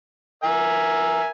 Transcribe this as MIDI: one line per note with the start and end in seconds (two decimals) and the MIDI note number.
0.44 1.29 70
0.44 1.29 76
0.44 1.29 80